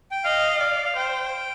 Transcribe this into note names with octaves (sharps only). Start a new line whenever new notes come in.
G5
D#5 F5
D5 F5
F5
C5 G5